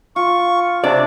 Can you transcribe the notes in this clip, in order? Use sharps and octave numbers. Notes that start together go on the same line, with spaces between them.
F4 C#6
C3 D4 D5